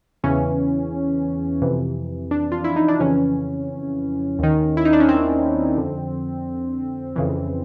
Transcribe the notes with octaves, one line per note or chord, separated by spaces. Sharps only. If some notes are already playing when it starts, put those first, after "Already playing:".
E2 C#3 E3 C#4
F2 C3 E3
D4
F4
E4
D#4
D4
F2 C#3 E3 C#4
D#2 D#3
E4
D#4
D4
C#4
C4
F2 D3
F2 C#3 E3